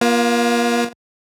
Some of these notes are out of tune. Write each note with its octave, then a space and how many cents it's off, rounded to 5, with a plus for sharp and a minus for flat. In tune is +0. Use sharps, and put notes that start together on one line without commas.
A#3 +35 F4 +0